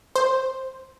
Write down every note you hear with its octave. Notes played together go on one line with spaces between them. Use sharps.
C5